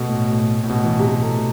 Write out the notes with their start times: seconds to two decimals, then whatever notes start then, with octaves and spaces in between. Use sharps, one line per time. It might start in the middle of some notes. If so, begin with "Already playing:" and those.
Already playing: B2 A3
0.09 A2
0.31 A2
0.64 A2
0.70 B2
0.84 E3
0.99 C3
1.22 A3